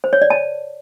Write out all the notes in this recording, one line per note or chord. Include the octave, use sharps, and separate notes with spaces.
C5
C#5
D5
A5